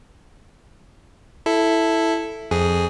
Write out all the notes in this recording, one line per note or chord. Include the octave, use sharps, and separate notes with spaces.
E4 A4
F2 G#4